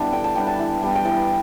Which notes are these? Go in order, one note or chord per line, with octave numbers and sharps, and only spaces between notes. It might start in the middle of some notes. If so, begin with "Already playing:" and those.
Already playing: G3 B3 D4 E4
D3 G5
A5
G3 B3 D4 G5
A5
E3
G3 B3
G5
E3 A5